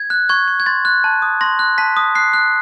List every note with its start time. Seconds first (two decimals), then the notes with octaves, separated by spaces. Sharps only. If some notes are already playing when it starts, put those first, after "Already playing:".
Already playing: G#6
0.10 F#6
0.29 C#6 G#6
0.48 C#6
0.60 G#6
0.66 C6 A6
0.85 F#6
1.04 A5
1.22 D#6
1.41 C6 A#6
1.59 F#6
1.78 A5 B6
1.97 D#6
2.15 F#6 C7
2.34 F#6